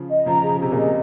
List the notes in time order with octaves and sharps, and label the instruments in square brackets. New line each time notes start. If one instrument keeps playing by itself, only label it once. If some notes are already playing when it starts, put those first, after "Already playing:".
Already playing: [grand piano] C#3 F3
[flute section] D#5
[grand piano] C#3 F3 [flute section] A#5
[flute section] G#4
[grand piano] C#3 F3
[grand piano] C3 [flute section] G#4
[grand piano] A#2 C#3
[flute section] D#5